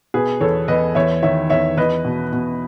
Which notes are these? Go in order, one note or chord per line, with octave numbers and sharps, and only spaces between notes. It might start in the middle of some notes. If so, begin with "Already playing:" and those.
B2 G#4 B4
E2 A4 C#5
E2 B4 D#5
E2 C#5 E5
D#3 C#5 E5
E2 C#5 E5
E2 B4 D#5
B2
B2